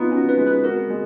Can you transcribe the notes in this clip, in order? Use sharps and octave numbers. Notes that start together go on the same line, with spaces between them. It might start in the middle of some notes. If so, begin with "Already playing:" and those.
Already playing: B3 D#4 F4
C#4 F#4
B4
G#3
B4
F#4 A#4
G#3